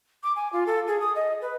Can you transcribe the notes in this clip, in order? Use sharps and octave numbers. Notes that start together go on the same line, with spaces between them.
D6
G#5
F4
A4
G#4
D#6
D#5
B4